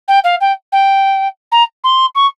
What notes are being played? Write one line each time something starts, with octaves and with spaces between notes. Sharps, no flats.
G5
F5
G5
G5
A#5
C6
C#6